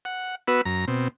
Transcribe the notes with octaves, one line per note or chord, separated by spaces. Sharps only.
F#5
B3 F#4 B4 E6
F#2 A#5
B2 C4